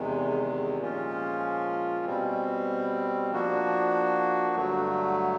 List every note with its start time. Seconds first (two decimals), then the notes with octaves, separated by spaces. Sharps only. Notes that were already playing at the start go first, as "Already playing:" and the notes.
Already playing: E2 C3 D#3 G#3
0.80 A#2 F3 G#3 C#4 F4
2.06 B2 G3 C4
3.31 F3 A#3 D4 F#4
4.55 G2 D3 F#3 A3